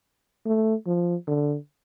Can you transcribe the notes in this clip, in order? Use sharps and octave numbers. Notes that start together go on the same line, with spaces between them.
A3
F3
D3